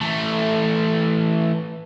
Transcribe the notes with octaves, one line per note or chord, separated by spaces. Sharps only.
E3 A3